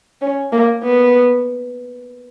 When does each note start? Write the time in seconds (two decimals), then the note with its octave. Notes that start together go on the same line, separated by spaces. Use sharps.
0.21 C#4
0.52 A#3
0.83 B3